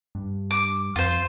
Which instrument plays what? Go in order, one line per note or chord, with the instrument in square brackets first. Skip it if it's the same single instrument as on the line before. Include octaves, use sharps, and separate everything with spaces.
[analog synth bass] G2
[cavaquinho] D6
[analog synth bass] F2 [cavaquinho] F4 C5